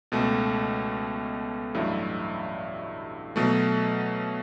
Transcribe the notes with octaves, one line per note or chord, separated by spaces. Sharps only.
C#2 B2 A3
A1 G2 F#3 A3 E4
B2 F#3 A3